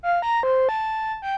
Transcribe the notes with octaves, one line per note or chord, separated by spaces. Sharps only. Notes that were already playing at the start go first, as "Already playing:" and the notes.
F5
A#5
C5
A5
G5